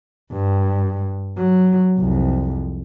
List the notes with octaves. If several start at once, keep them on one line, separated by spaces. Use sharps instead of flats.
G2
F#3
C2 F2